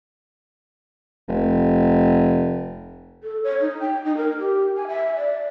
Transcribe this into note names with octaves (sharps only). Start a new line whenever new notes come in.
F1
A4
C#5
D#4
G5
D#4
A#4
G4
G#5
E5
D5